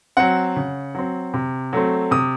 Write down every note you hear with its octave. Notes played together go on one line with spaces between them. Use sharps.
F#3 C4 F#5
C#3
F#3 C4
C3
F#3 A3 C4
C3 D#6